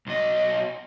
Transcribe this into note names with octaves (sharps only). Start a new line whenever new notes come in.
B1 D#5